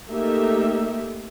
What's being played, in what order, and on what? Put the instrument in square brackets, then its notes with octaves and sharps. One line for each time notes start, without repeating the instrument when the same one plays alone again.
[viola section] A3 A#3 D#4 G4 E5